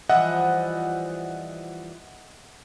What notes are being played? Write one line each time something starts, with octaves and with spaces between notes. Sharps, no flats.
E3 F3 G3 D#5 E5 F#5